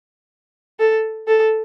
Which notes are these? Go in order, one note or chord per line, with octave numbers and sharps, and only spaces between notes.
A4
A4